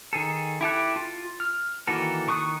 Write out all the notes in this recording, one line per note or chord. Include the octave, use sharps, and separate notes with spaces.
D#3 G#4 A4
E4 G4 A4 F#6
F4
F6
D#3 E3 A#3 F#4 A4
D#3 C#6 D#6 F#6